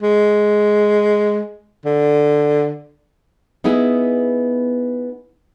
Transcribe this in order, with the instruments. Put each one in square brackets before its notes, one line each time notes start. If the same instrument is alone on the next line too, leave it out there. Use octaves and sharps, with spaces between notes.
[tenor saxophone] G#3
D3
[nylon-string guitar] B3 D#4 E4 G#4